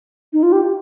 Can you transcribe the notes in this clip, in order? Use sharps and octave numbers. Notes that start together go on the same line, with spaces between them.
D#4
F4
G4